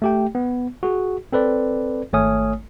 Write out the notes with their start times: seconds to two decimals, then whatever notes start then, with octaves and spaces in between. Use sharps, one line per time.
0.02 A3 G4 G5
0.35 B3
0.83 F#4 G#4
1.32 C4 A4 B4 D5
2.13 G#1 A3 C#5 G#5 D#6 F6